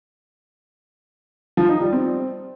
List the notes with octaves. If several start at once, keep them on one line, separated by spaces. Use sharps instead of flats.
F3
D#4
G3
C4